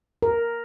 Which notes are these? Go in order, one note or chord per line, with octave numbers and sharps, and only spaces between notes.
A#4